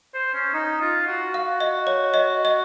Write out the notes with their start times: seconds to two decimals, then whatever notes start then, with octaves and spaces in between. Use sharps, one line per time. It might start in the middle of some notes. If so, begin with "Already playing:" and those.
0.14 C5
0.34 C#4
0.53 D#4
0.81 F4
1.07 F#4
1.34 F5
1.60 D#5
1.87 C#5
2.14 D#5
2.45 D#5